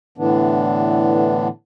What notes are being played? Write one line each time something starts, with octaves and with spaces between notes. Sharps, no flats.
A2 D3 E3 B3 D4